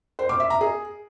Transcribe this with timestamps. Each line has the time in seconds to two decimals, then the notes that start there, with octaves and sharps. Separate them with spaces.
0.19 C5
0.29 D6
0.40 E5
0.50 A#5
0.61 G#4